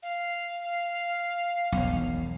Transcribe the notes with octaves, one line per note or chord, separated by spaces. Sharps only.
F5
E1 B1